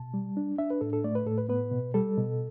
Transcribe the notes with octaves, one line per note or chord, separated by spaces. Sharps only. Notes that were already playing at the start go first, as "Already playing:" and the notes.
Already playing: B2 A5
G3
D4
D4 E5
B4
A2 A4
A4
A3 D5
B4
A2 A4
B4
B3 B4
B2
G3 A4
B2